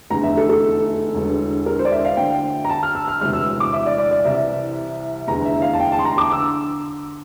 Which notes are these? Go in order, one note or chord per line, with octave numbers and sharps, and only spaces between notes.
F1 E2 D3 A#5
E5
A4
A4
E1 E2 D3
A#4
C5
D5
E5
F5
D2 D3 G5
A#5
A5
F6
E6
F6
E1 D2 C3 E3 F6
E6
D6
E5
D5
D5
D5
C2 C3 E3 E5
F1 E2 D3 A#5
E5
F5
A5
G5
A5
C6
A#5
D6
D3 E6